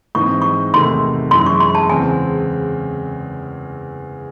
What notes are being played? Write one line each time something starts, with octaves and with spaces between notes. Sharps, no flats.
G#2 E3 C4 D#4 C#6
C#6
E2 C3 D#3 A3 C6
F#2 E3 G#3 C6
C#6
C6
A5
E2 C#3 G#3 C4 G#5